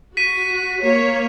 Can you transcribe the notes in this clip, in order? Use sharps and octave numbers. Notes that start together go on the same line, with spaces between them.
F#4 B6 D#7
A#3 C#5